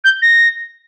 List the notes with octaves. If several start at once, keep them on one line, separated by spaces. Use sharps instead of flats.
G6
A#6